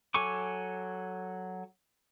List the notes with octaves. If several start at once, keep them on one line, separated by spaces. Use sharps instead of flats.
F#3 A4 G#5 C#6 D6